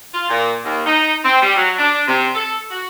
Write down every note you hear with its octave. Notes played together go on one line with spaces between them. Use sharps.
F4
A#2
D#2
D#4
C4
G3
F#3
D4
C3
A4
F#4